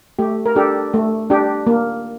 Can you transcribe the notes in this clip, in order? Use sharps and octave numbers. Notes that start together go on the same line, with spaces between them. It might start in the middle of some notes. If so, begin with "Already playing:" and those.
A3 G4
A#4
D4 G4 A4
A3
D4 G4
A#3